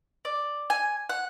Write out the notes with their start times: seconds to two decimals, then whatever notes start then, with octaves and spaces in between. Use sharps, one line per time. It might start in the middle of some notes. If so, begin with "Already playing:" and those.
0.25 D5
0.70 G#5
1.09 F#5